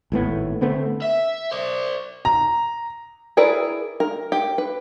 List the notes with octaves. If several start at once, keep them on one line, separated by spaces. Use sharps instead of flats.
G#1 A2 B3
D3 A3 B3 C4
E5
C5 D5
A#5
E4 G#4 A#4 B4 D5
A#4
G4
B4